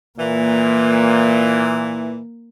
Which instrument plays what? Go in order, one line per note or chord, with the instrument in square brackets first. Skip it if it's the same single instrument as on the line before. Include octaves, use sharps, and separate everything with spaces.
[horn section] A#2 E3 [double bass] A#3